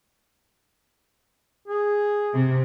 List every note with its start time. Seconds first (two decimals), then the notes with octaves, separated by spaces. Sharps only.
1.68 G#4
2.34 C3